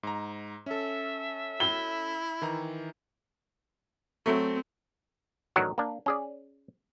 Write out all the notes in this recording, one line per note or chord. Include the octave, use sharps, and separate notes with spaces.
G#2 A#5
C#4 A4 E5
E4 G7
D#3 E3 A#5
F#3 A3 C4
A1 D#3 F#3 D4 F#4 A#4
A#3 D4
C#4 G#4 D5